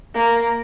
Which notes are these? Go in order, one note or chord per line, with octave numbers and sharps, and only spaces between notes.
A#3